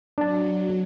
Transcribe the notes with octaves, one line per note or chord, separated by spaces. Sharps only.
F#3 D4 A5